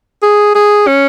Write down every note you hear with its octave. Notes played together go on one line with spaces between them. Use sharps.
G#4
G#4
C#4